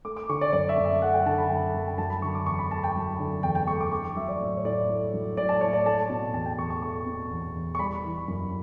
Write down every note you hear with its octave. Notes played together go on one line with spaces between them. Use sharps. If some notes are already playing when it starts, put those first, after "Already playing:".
A3 D6
D6
D3 C#6
D5
F#2 D5
E5
F#2
E5
A3 F#5
G5
D3 A5
B5
F#2 G5
F#2 A5
G5
F#3 A5
B5
D3 C#6
D6
E2 C#6
B5
A3 A5
G5
F#3
D3
E2 G5
G5
A3 C#6
D6
A3 C#6
D6
F#3 E5
D5
A2
C#5
A2 D5
A3
F#3
A2 D5
A5
A2 C#5
D5
A3 A5
B2
E2 A5
G5
E2 C#6
C#6
A3 C#6
B2
E2
E2
C#6
G3 B5
E3
F#2